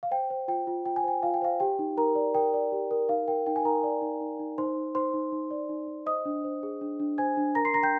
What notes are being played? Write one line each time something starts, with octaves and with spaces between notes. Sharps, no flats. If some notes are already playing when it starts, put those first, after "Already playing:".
F5
C5 G5
C5
F4 G5
F4
F4 G5
G#5
C5 G5
F4 F5
G5
C5 F5
G4 G5
D#4
D#4 A#4 A#5
D5
A#4 G5
D5
G4
A#4
D#4 F5
A#4 G5
D#4 G5
G#5
D#4 A#4 A#5
D5
D#4
D#4
D#4
D#4 C5 C6
D#4
D#4 C5 C6
D#4
D#4
D5
D#4
D#4
C5 D#5 D#6
D4
C5
G#4
D4
D4
C5 G#5 G#6
D4
A#4 A#5 A#6
C6 C7
D4 A#5 A#6
G5 G6